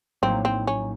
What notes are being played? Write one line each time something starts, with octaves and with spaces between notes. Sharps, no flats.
A#1 A2 F#3 A#3 C4 D#4
C4
C#4